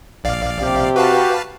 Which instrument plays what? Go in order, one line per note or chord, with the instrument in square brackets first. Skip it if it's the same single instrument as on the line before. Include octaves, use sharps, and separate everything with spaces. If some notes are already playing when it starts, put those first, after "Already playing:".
[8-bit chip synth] A#1 D5 F5
[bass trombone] C3 [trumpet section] G4
[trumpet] F#4 [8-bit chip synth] B4 F5 A5